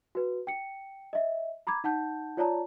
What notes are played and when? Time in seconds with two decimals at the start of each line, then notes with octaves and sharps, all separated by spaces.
0.15 F#4 B4
0.47 G5 C#7
1.13 D#5 E5
1.67 A#5 B5 D6 G#6
1.84 D#4 F#5 A5 G6
2.37 F4 C#5 D5 A5 A#5